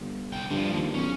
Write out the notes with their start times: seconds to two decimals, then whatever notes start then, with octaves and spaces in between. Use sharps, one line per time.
0.01 G1
0.32 C2 G5
0.51 G2 D3 F3
0.73 D#2
0.94 B1 C#4